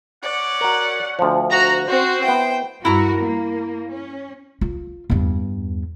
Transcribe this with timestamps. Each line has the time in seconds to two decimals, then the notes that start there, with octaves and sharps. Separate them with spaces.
0.23 C#4 D5 F#5
0.61 F#4 A#4
1.19 D2 F3
1.50 F#4 A#5
1.88 C4 F#4 C5
2.24 B3 E4 G5
2.85 G2 E4 F#4 A#4 A#5
3.23 A#3
3.92 C#4
4.61 F4
5.10 E2 G2